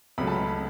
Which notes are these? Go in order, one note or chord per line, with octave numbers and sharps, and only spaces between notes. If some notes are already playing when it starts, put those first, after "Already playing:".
C#2 C#3 F#3 A3 C#4 B5
A5
B5